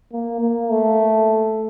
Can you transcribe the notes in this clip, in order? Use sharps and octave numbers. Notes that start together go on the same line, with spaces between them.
A#3
A#3
A3